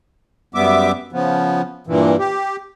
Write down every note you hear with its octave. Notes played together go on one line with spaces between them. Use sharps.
F#2 G3 B3 E5 D6
C#3 F3 B3
G2 A#2 E3
G4